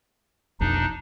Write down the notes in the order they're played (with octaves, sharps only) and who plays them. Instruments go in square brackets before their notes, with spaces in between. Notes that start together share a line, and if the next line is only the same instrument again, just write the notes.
[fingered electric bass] F1 B1 F2 [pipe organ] D4 D#4